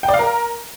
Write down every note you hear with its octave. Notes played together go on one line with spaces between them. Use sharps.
G5
D5
F5
A#4